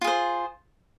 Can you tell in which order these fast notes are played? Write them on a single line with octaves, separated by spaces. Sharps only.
F4 G#4 C5